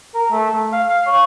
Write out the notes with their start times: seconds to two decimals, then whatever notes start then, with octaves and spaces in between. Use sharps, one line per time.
0.14 A#4
0.31 A3
0.50 A3
0.72 F5
0.88 F5
1.07 C#5